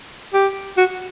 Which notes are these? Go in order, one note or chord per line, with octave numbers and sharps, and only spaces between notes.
G4
F#4